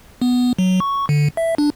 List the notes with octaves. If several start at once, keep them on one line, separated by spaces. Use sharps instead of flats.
B3
F#3
C#6
D3
E5
D4